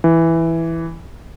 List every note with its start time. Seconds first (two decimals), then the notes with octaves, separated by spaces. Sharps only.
0.04 E3